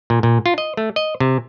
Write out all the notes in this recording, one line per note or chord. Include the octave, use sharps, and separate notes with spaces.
A#2
A#2
F4
D#5
A3
D#5
C3